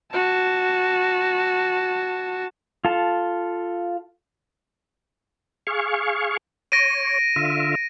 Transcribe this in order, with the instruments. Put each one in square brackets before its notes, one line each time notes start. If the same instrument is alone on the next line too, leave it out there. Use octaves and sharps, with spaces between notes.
[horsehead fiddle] F#4 A5
[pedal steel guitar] F4 A4 A5
[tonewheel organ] G#4 F5 C#6
[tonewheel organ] C#5 [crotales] A#6 D7 D#7
[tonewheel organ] D3 F4 E5